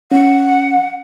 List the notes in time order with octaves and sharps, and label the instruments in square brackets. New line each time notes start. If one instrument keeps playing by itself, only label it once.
[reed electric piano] C#4 [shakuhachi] F#5